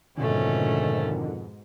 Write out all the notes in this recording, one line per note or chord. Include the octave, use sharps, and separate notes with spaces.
F2 G#2 B2 D3 D#3 A3 C#4